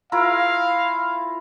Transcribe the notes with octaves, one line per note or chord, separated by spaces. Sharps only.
E4 F4 A#4 F5